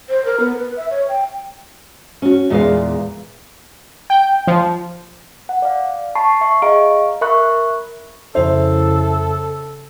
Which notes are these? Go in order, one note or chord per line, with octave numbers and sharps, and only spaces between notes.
C5
A#4
B3
B4
E5
C#5
G5
C#4 F#4
E2 A#2 G#3 A#3 B3 F5
G5
F3
F#5
D5 F5
A5 B5 C#6 C7
E5 C#6
G#4 D#5 F5 A#5 C#6 D7
A#4 E5 B5 C#6 F#6
F2 C#3 E4 A4 C5 E5